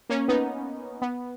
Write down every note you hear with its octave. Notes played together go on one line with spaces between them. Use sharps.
A#3 C#4
B3 D#4
B3